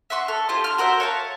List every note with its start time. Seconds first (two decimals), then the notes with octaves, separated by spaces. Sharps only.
0.10 E5 F#5 C6 C#6
0.28 A4 F6
0.49 E4 F4 G4 C5
0.64 C6 F6
0.78 F#4 A#4 C5 E5
1.00 C#5 F5 A5